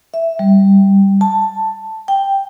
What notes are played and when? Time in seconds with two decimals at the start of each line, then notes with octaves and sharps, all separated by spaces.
0.14 E5
0.39 G3
1.21 A5
2.08 G5